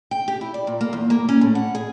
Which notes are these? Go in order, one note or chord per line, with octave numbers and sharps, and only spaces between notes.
G5
G4
E4
D5
A#2
A#3
E2
A#3
C#4
A2
F#5
G#4